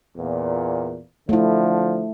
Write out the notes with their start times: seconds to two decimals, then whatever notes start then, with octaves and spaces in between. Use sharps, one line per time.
0.17 E2 A#2
1.29 D3 F3 A3 E4